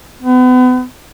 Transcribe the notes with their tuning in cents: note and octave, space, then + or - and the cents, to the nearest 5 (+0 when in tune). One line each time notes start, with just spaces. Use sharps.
B3 +35